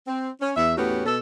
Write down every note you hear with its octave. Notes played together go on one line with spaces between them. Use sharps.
C4
C#4
E2 E5
E2 A2 B3 C#4 F#4 G4
B2 A4